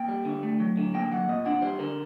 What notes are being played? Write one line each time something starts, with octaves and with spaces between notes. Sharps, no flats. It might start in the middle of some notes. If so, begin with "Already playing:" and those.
Already playing: A#3 G5
G3
D3
A3
F#3
D3
A#3 G5
F#3 F#5
A#2 D#5
D4 F#5
G3 C5
D3 A#4